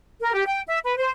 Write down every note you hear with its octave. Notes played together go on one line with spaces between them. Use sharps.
A#4
G4
G5
E5
B4
C5